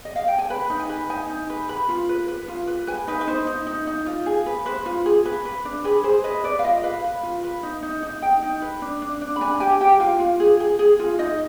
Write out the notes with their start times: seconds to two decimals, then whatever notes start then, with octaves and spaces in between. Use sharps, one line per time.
0.05 D#5
0.16 F5
0.28 G5
0.38 G#5
0.50 B4 B5
0.70 D#4
0.80 G#5
0.89 B4
1.09 D#4 G#5
1.29 D#4
1.50 B4
1.69 B4 B5
1.89 F4
2.09 B4
2.28 B4
2.48 F4
2.67 B4
2.87 B4 G#5
3.07 D#4 B4
3.21 B4
3.27 D#4 C5
3.47 D#4
3.67 D#4
3.87 D#4
4.06 F4
4.26 G#4
4.46 B4
4.66 B4 C5
4.86 F4
5.06 G#4
5.25 B4
5.45 B4
5.65 D4
5.84 G#4 B4
6.04 G#4 C5
6.24 B4 D#5
6.44 B4 D5
6.59 F5
6.64 F4 D#5
6.83 B4 F5
7.04 B4
7.23 F4
7.44 B4
7.63 D#4
7.82 D#4
8.03 D#4
8.22 D#4 G5
8.42 D#4
8.62 B4
8.82 D4
9.02 D4
9.21 D4
9.36 B5
9.41 D4 G#5
9.60 G4 G#5
9.81 G4 G5
10.00 F4 F5
10.20 F4
10.40 G#4
10.60 G#4
10.79 G#4
10.99 F4
11.19 D#4 D#5